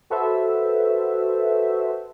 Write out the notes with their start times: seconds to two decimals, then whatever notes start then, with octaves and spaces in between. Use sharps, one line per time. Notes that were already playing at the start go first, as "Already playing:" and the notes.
0.10 F#4 A4 B4 C5 E5